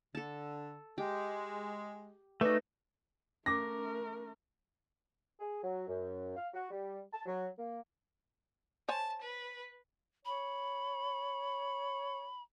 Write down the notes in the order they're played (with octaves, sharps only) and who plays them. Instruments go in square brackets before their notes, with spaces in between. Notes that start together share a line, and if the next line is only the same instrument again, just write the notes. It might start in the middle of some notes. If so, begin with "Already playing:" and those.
[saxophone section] D3 [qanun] A4 A5
[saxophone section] G#3 [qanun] G4
[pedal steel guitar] A3 D#4 [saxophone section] F#4 G#4 D5 [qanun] A4 [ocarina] B4
[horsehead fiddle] A3 A#4 [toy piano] C#4 D6 [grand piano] A#6
[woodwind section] G#4
F#3
F#2
F5
F#4
G3
A5
F#3
A#3
[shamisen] C5 C#5 G#5 [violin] A5
[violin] B4
[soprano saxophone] C#5 [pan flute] B5